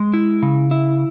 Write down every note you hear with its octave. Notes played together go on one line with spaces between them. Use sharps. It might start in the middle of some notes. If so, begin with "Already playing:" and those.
Already playing: G#3
E4
C#3
E4